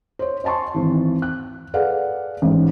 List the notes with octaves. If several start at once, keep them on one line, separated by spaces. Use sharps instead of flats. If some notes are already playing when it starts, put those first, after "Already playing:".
C5 C#5
D#5 G#5 A5 C6 C#6
G#1 E3
F#6
G#4 A4 B4 D5 F5 F#5
A1 G#2